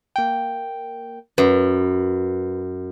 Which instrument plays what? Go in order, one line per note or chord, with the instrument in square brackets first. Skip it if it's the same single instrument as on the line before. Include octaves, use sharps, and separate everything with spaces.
[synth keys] A#3 G5
[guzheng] F#2 [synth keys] B4